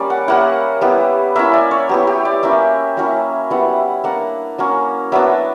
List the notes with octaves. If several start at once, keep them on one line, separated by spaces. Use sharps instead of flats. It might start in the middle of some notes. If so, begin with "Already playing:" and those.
Already playing: G3 A#3 C#4 D5
F#5
G3 A#3 E4 F#5
G3 B3 E4
A#3 C#4 E4 E5
D5
C#5
F#3 B3 E4 G4
G4
D5
A#3 C#4 E4 E5
F#3 A#3 C#4 E4
G3 B3 E4 F#5
A#3 D4 F#5
F#3 A#3 C#4
F#3 B3 D4 E5